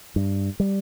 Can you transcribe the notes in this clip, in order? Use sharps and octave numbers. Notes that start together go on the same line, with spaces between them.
G2
G3